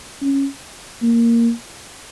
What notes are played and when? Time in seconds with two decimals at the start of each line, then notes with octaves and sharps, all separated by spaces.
0.22 C#4
1.03 A#3